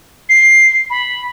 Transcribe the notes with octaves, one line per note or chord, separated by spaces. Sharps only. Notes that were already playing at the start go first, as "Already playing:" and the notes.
C7
B5